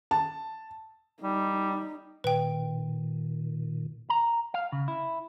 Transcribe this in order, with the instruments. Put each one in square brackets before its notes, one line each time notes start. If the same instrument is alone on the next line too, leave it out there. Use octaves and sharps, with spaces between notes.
[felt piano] A5
[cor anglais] G3 [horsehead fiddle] D#4
[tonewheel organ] A#2 D#3 [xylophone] B4 G5
[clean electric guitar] A#5
F5
C#3
E4